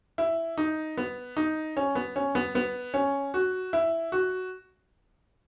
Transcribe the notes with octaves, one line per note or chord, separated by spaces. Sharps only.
E4
D#4
B3
D#4
C#4
B3
C#4
B3
B3
C#4
F#4
E4
F#4